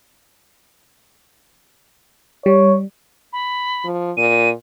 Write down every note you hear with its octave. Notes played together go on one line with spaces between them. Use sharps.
G3 C#5
B5
F3
A#2 D#7